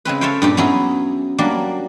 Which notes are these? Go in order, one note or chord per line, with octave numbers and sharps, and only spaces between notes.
C#3 G#3 C4 B4
A4 C5 C#5 E5 F5 G5
G2 A#2 G4
F#3 B3 C#4 E4 G#4
F#3 G3 A#3 D4